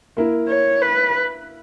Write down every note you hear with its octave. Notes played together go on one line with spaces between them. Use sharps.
A#3 E4 A#4
C#5
B4